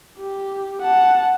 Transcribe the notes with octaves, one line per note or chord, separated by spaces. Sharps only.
G4
F#5 A5